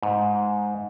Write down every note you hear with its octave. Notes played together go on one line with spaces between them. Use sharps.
G#2